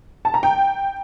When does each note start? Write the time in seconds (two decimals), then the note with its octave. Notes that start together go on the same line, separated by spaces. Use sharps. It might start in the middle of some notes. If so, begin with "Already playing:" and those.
0.25 A5
0.34 A#5
0.43 G5